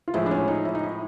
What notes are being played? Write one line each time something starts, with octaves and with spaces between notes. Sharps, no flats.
F4
A2 F3 G#3 E4
D4
C#4
D#4
E4
D#4
E4